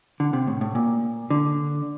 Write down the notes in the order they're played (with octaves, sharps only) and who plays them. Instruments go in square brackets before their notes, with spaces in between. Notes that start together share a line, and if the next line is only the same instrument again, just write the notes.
[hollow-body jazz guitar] D3
C3
A2
A2
A#2
D3